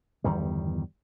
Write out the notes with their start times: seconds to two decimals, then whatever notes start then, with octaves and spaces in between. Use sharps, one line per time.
0.24 G1 E2 D#3 G3